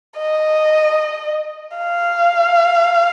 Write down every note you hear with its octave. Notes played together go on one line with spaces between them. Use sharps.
D#5
F5